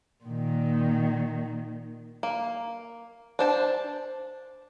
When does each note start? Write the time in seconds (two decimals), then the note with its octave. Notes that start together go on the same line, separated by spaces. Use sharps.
0.24 A#2 D#3
2.23 A#3
3.39 D4 C5 A5